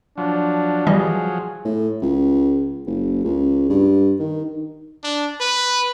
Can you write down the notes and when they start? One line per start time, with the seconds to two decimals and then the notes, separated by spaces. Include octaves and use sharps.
0.17 F3 F#3 D4
0.87 E3 G3 G#4 D#5
1.65 A2
2.02 C#2
2.86 F#1
3.24 C#2
3.69 G2
4.19 D#3
5.04 D4
5.41 B4